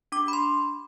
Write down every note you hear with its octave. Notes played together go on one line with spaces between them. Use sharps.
D4 G4 D6
B5
C6